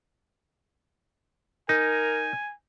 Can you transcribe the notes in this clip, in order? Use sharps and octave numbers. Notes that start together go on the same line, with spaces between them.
D#4 A#4 G#5